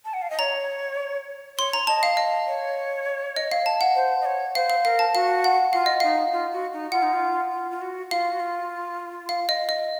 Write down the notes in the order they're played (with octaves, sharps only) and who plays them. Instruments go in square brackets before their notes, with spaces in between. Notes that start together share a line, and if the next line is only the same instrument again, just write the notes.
[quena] A5
F#5
F5
D#5
[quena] C#5 [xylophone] A#5
[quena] C#5 [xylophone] C6
[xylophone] A#5
[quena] D#5 [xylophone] A5
[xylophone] F5
D#5
[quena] C#5
[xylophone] D#5
F5
A5
F#5
[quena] C5
D#5
C#5
[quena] C5 [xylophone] F5
[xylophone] F5
[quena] A#4 [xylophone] F5
[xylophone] A5
[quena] F#4 [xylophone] F5
[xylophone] F#5
[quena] F4 [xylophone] F5
[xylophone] D#5
[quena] D#4 [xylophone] F5
[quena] F4
F#4
D#4
[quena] F4 [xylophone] F#5
[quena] D#4
F4
F4
F4
F#4
[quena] F4 [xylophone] F5
[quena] F#4
F4
[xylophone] F5
D#5
D#5